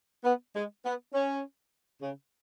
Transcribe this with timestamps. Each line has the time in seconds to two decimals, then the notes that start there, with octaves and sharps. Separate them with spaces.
0.24 B3
0.54 G#3
0.84 B3
1.13 C#4
2.02 C#3